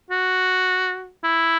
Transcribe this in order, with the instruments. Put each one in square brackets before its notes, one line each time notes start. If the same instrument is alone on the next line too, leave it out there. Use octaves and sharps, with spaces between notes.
[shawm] F#4
E4